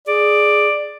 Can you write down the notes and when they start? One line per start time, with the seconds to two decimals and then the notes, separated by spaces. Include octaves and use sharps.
0.07 G#4 D5